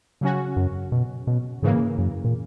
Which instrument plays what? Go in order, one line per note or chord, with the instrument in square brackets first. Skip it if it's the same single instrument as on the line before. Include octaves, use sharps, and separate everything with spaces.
[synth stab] C#3 F#3 C#4 F#4
[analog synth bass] F#2
B2
B2
[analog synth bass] G#2 [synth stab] C#3 E3 A#3
[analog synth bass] F#2
A#2